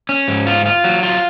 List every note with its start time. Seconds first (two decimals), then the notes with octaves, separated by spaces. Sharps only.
0.09 C#4
0.28 G#2
0.47 F4
0.65 F4
0.84 F#3
1.03 F4